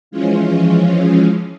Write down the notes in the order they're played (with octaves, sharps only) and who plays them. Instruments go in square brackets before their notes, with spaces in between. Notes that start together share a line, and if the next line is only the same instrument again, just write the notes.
[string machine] E3 F3 G#3 C#4 F4